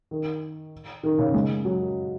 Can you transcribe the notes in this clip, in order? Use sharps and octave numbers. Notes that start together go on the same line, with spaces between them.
D#3
D#3
C#3
G#3
F#3